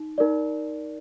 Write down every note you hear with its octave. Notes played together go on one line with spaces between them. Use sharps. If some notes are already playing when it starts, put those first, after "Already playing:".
Already playing: D#4
D#4 A#4 D5